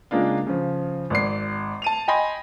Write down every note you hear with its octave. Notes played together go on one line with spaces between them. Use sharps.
C#3 G#3 A#3 D4 F4
C#3 F3
G#1 D5 C7
A5 D#7 F7
D#5 G5 G#5 B5 C6 A#6